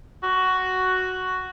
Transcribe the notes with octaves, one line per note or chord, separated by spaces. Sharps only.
F#4